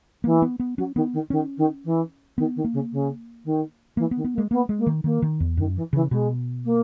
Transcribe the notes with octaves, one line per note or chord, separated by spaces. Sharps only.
E3 A#3
B3
B3
F#3 C#4
D#3 B3
D#3
D#3 C#4
D#3
E3
D#3 B3
D#3
A#3
C#3
C#3
D#3
E3 A#3
B3
D#3
B3
A#3
G#3
A#3 B3
G#3
A#3
D#3
D#3 A#3
D#3
E2
F#2 D#3
E3
C#3 E3
B2 G#3
A#3